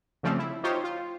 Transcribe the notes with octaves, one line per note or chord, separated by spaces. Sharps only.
C#3 F3 G3 A3 C4 C#4
E4
D#4 F4 G4 C5 C#5
F4